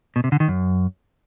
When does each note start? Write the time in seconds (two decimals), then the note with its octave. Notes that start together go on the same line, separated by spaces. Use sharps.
0.16 B2
0.24 C3
0.32 D3
0.40 D#3
0.48 F#2